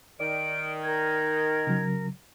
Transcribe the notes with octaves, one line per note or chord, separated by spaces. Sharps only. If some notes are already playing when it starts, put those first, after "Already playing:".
D#3 D5 D7
A#4 G#6
C#3 F#3